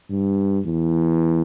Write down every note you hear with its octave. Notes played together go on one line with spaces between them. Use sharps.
G2
E2